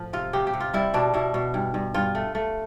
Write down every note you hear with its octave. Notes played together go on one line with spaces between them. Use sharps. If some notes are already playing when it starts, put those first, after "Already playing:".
Already playing: A2 F3
C3 F4
C3 G4
G4
C3
F4
G3 E4
B2 D4
B2 E4
B2
G2
G2
G2 F4
A3
A3